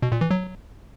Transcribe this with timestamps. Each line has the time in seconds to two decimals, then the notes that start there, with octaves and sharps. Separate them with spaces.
0.02 B2
0.12 A#2
0.21 E3
0.31 F#3